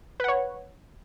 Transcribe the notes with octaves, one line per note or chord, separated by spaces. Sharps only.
B4 C#5 F#5